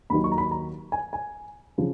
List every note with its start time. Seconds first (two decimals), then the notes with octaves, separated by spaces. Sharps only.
0.10 D#2 D#3 F#3 B5
0.24 C#6
0.32 A#5
0.38 B5
0.51 A#5
0.92 G#5
1.13 G#5
1.78 C#3 F3